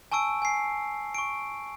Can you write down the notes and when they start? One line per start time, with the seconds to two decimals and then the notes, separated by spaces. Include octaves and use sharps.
0.12 G#5 A5 C#6 E6 D7
0.42 G#5 C7
1.15 C#6 D7